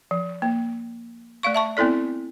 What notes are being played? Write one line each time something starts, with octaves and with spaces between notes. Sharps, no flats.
F3
A#3
A3 D5 F5 C#6
E5 A5 C#6
B3 C4 E4 A4 D5